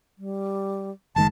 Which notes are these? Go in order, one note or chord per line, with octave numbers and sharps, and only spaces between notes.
G3
F#1 D#3 G#3 A5